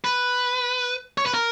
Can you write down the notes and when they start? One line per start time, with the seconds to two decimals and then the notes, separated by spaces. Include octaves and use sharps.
0.04 B4
1.18 C#5
1.26 B4
1.34 A#4